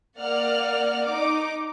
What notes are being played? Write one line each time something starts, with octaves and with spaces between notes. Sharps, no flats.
A#3 D5 F#5 F6
D#4 D6